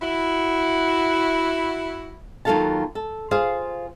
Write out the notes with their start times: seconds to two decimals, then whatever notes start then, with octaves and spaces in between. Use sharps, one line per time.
0.01 E4 F#4
2.45 D#2 F#3 F4 A4 F5 A5
2.95 A4
3.31 F4 G#4 C5 F5